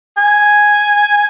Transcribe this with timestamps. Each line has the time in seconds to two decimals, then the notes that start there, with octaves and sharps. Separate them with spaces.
0.17 G#5